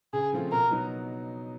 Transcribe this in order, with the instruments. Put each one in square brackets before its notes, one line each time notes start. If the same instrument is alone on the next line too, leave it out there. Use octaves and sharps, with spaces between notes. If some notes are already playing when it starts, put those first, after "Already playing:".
[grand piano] C#3 [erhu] G#4
[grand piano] F3 A3 C4 F4
[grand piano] B2 [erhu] A#4
[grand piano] F#3 B3 D#4